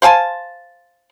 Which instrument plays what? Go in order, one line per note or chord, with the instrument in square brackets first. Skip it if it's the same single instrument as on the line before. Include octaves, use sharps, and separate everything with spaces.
[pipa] C5 F5 G#5 A5